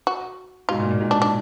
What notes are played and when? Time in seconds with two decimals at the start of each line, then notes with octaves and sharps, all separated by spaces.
0.07 F#4
0.69 G#2 B2 F4
0.80 A#2
0.91 A#2
1.01 G#2
1.11 D4
1.22 D4